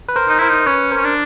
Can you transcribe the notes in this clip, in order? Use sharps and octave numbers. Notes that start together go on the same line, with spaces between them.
B4
A#4 C5
D#4
E4 A#4 C5
D#4
C#4 B4 C#5
A#4 C5
C#4
D4